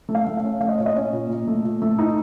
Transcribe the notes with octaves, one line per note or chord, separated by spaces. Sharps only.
A3
F5
A3
F5
C#4
A3 F5
D#5
A#2 C#5
D#5
C#4
A#2
A#2
A3
A#2
A3
D#4